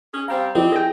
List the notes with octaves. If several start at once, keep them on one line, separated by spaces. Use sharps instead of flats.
C#4 G#4
G3 C4 F5 A#5
F3 C4 E4 G4 D5 D#5
E4 G#4 G5 A#6